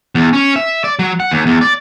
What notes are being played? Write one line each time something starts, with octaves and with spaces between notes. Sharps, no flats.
E2
C#4
E5
D5
F#3
F#5
D#2
E2
D5